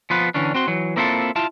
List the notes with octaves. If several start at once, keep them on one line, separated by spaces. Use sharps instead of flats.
F3 B3 F4 B4
D3 E3 C#4 D4
C4 F#4 C6
E3 F#3
A#3 C4 E4 F4 G4 A4
E4 F4 A5